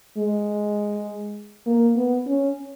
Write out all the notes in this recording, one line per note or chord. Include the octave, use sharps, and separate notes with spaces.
G#3
A#3
B3
C#4